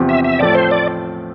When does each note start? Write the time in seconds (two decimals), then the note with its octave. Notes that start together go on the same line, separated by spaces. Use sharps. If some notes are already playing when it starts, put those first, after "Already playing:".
Already playing: E2 C3 F3 C4 G4
0.09 E5
0.24 E5
0.39 A2 F3 A3 C4 D5
0.55 C5
0.71 D5